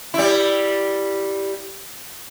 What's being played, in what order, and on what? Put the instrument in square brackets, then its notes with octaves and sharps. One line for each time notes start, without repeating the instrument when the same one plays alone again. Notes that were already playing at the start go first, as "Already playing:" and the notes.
[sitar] G3 E4